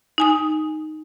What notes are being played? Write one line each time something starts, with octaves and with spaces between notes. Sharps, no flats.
D#4 G#5 D#6